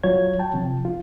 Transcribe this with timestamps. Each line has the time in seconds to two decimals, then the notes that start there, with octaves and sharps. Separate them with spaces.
0.03 F#3 F4 C#5 G#6
0.39 G5 A5
0.54 C3 F3
0.85 F4